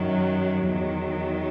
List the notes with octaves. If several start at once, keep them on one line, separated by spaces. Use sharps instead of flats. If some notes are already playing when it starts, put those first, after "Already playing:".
Already playing: F#2 D#3 F#3
E2 D#3 F#3